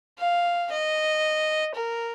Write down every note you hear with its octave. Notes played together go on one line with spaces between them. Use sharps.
F5
D#5
A#4